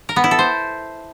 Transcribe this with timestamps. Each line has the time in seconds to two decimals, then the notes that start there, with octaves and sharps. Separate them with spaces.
0.09 A#4
0.16 B3
0.24 E4
0.31 A4
0.39 C5